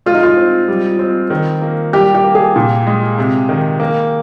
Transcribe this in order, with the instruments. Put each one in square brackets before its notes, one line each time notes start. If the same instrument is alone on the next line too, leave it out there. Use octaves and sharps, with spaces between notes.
[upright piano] G#3 [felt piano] F4
[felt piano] D#4
F4
[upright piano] C4
G3
C4
D#3
A#3
[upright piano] G3 [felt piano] G4
[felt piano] G4
[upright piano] A#3
[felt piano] G#4
[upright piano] A#2
G#3
C3
D#3
A#3